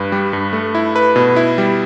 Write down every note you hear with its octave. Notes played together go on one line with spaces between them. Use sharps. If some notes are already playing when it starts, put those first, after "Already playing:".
Already playing: G2 B4
G3
G2
A3
E4
B4
B2
E4
G3